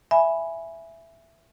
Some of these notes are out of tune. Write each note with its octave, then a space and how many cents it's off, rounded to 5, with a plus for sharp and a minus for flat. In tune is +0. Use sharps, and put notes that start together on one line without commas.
E5 +10 G#5 +0 B5 +0